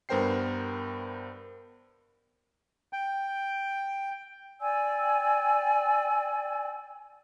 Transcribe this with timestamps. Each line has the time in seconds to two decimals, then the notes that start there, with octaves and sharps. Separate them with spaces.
0.09 G2 B3 A#4 C5 G5 C7
2.93 G5
4.60 D5 G5 G#5 E6